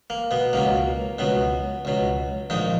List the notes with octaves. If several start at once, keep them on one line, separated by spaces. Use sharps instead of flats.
A#3
B2 B3
C#2 B2 F#3 A#3
C#2 B2 F#3 B3
C#2 B2 F#3
A#1 G#2 D#3 F3 D#4